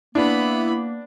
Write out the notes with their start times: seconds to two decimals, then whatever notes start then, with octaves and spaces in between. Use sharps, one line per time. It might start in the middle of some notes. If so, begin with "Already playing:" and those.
0.15 A#3 B3 D4 E4 B5